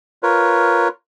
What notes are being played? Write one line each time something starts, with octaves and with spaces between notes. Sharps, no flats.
F4 A#4 B4 C#5